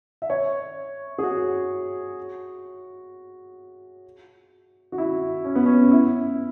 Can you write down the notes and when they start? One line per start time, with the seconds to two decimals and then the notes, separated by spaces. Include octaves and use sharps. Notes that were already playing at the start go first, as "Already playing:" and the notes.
0.22 E5
0.30 C#5
1.18 G#4
1.23 F#4
4.92 F#4
4.98 E4
5.45 C#4
5.55 B3
5.66 C#4
5.91 E4